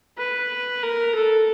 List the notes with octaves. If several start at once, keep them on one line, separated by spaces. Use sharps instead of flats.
B4
A#4
A4